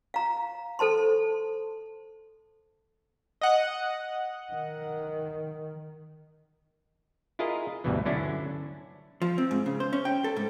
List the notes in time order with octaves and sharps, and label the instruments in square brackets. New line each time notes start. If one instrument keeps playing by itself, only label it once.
[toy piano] F5 A#5
A4 C5 A5 C6
[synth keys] D#5 F#5
[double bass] D#3
[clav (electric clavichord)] E4 F4 G#4 A#4 D#5
D2 G2 B2 E3
D3 F#3 C#4 D4 E4
[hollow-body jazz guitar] F3
C4
G#2
C#3
C5
C#4
G5
A4
G#2